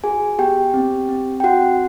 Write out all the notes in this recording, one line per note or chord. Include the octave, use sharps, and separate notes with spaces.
F#4 G#4 G#5
B3 G4 G5
C4
C4
G5
C4 F#4 F#5